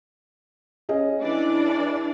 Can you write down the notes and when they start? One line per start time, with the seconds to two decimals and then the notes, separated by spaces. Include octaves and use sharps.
0.89 C#4 G#4 D#5
1.22 E3 D4 D5